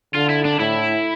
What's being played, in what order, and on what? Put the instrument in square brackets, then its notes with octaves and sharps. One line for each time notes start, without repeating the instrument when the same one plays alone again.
[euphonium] D3 [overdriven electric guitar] F4
[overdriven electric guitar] E4
D4
[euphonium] A2 [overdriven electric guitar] E4